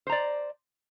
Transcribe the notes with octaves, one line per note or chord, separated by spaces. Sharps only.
C5 D5 A#5